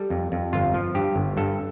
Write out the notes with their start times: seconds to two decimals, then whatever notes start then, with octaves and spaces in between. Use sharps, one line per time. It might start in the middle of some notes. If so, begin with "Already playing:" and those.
Already playing: G3 A4
0.10 F2
0.32 F2
0.53 G1 F4
0.74 F3
0.95 G2 G4
1.16 G1
1.37 G2 A4